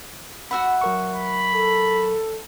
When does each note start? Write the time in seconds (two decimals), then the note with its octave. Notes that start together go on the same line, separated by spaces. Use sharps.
0.51 F#4 E5 F#5 B5
0.81 F#3 A#4 C#6
1.14 B5
1.54 A4